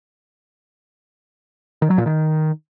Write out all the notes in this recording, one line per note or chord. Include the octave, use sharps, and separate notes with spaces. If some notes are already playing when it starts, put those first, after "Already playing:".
D#3
F#3
A#2
D#3